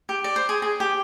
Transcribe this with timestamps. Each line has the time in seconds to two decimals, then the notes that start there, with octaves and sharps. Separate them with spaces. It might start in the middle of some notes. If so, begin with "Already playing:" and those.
0.09 G4
0.24 D5
0.36 C5
0.49 G#4
0.62 G#4
0.80 G4